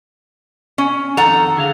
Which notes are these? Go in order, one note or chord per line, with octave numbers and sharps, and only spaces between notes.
C#4
F2 D#3 A4 F#5 A#5
D3 G#4 F5